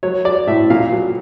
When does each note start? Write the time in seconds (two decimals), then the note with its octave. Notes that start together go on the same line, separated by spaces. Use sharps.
0.03 F#3 C#5
0.25 F#3 D5
0.47 A2 E5
0.70 A#2 F5
0.92 F#3